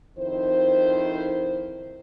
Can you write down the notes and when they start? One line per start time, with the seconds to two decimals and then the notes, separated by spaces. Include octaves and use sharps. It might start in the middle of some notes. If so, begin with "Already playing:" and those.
0.17 F2 D#3 E4 C5